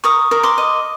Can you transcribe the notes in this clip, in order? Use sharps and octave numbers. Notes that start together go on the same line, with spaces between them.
A#4 C#6 D#6
A#4
C6 D6
D#5